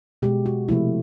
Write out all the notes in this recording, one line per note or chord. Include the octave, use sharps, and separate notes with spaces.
B2 G#3 G4
F#4
C3 F3 A3 E4